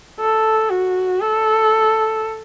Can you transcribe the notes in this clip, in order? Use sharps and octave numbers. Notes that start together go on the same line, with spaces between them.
A4
F#4
A4